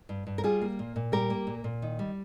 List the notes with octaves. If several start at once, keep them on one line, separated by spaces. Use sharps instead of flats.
G2
G2
A#4
G3 F4 G#4
A#3
A#2
A#2
G3 G4 A#4
A#3
A#2
A#2
D#3
G3